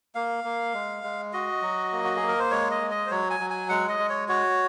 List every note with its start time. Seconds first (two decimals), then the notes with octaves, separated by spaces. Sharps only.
0.15 A#3 F5
0.44 A#3
0.74 G#3
1.04 G#3
1.33 F#4 D#5
1.62 F#3
1.92 A#3
2.04 F#4
2.16 G#4
2.22 A#3
2.28 A#4
2.39 C5
2.51 G#3 C#5
2.71 D#5
2.81 G#3
2.91 D#5
3.06 C5
3.11 F#3 C#5
3.30 G#5
3.40 F#3
3.50 G#5
3.69 G#3 F#5
3.89 D#5
3.99 G#3
4.09 C#5
4.28 F#4 C#5